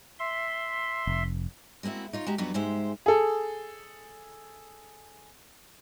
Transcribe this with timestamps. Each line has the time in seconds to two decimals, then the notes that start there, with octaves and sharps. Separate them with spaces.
0.19 E5 C6
1.07 F1
1.83 G#3 A#3 C4 E4 F#4
2.13 D#4 F4 C#5
2.27 G#3 F#4 G4 A#5
2.38 F2 F#3 G3 B3 D4 B4
2.54 G#2 G#3 G4 C5 E5
3.06 G#4 A4